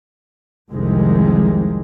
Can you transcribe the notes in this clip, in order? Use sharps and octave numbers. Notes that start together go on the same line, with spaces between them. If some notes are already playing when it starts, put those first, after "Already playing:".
F1 C2 C3 D#3 G#3